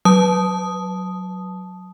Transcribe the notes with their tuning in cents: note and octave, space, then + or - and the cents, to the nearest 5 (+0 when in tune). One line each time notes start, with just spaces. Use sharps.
F#3 +0 A5 -10 D#6 +0